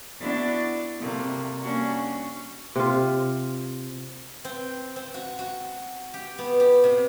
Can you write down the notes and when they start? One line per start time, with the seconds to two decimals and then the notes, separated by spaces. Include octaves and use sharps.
0.21 B3 D4 E4 F#4 A6
0.99 C3 G3 A3 A#3
1.63 G3 A#3 C#4 D4 F#4
2.76 C3 F4
4.45 C4
4.96 C4
5.14 F#4
5.39 F#4
6.14 G4
6.38 B3
6.60 G4
6.84 C3